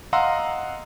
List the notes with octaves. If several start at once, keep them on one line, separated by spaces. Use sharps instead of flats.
D#5 F5 F#5 A#5 C6 E6